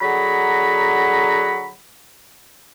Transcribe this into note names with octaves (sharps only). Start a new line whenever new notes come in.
D3 F#3 G#4 F#5 A#5 B5